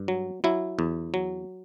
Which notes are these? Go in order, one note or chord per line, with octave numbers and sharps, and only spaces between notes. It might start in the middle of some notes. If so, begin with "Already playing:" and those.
Already playing: G2
F#3
F#3 E4
E2
F#3